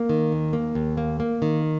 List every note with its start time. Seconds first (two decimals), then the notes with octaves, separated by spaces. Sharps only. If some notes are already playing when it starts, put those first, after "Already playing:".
Already playing: A#3
0.09 D#3
0.32 D#2
0.53 A#3
0.75 D#2
0.97 A#3
1.20 A#3
1.42 D#3